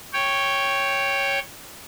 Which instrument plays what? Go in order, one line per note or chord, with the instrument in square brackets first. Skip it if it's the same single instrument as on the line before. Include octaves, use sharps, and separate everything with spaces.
[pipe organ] C#5 G5